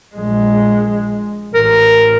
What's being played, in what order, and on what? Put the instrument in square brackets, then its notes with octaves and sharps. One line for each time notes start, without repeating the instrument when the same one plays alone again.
[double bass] A#1 G#3
[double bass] A1 [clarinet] A#4